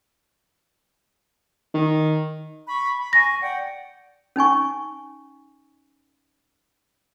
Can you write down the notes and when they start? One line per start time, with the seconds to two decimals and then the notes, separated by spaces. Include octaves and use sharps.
1.74 D#3
2.68 B5 C#6
2.99 B5
3.13 G#5 C#6 A#6
3.40 D5 F#5 G5
4.36 C#4 D#4 G#5 C#6